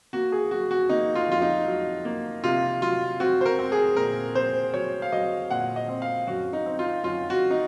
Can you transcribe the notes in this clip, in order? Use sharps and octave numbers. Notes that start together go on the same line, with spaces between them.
A#3 F#4
G#4
F#3 F#4
F#4
A#3 D#4
F4
F2 F4
D#4
F#3
A#3
C3 F4
F#3 F4
C4 F#4
C5
A#4
C4
G#4
A#2 A#4
C4 C5
F#3 C#5
F5
F#3 D#5
A#2 F#5
D#5
C4
F5
F#2 F#4
D#4
C4
F4
F#2 F4
F#4
D#4